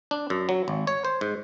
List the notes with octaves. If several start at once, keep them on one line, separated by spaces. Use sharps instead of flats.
D4
F#2
F#3
G#1
C#5
C5
G#2